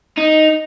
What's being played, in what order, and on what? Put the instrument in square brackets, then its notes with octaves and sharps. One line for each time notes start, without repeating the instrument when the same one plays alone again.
[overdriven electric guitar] D#4